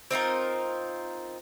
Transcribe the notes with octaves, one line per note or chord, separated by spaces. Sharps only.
C4 D#4 F4 A#4